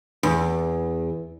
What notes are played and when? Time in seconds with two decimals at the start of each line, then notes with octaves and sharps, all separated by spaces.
0.23 E2